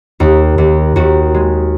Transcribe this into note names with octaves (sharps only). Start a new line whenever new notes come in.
D#2 D#4
D#2
D#2 F#4
G#3